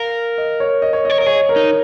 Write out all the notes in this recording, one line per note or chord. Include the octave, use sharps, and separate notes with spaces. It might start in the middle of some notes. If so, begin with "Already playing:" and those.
Already playing: A#4 F5
D#5
C#5
D#5
C#5
C#5 D#5
A#4 D#5
G#4 C#5
A#4
D#4